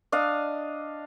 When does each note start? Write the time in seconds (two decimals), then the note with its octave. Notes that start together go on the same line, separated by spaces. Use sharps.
0.12 D4 D#5 F5